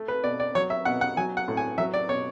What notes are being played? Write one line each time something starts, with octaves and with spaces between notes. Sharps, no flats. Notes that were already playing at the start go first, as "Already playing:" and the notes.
Already playing: A3
B4
B2 D5
D5
F#3 C#5
E5
B2 F#5
F#5
F#3 G#5
F#5
A2
G#5
F#3 E5
D5
B2 C#5